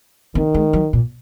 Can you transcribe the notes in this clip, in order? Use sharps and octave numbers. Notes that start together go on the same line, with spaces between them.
D#3 C4
G#3
F#3
A#2